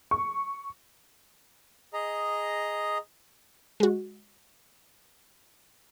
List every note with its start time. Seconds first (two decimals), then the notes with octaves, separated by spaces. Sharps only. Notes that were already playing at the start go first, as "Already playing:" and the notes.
0.11 C#6
1.94 G#4 D#5 A#5
3.80 G#3 F#4